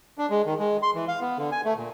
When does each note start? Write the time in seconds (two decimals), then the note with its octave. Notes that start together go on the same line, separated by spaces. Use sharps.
0.18 D4
0.30 G#3
0.46 D#3
0.59 G#3
0.82 C6
0.95 E3
1.08 F5
1.21 B3
1.38 D3
1.52 G#5
1.65 A3
1.77 A#2